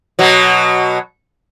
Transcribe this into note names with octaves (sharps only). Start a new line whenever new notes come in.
B2 F#3